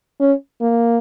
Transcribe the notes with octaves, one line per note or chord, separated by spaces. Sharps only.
C#4
A#3